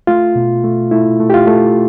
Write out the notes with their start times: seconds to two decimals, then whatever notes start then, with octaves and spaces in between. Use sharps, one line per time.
0.07 A3 F4
0.36 B2
0.64 A3
0.91 A3 E4
1.20 A3
1.30 G4
1.34 F4
1.47 A3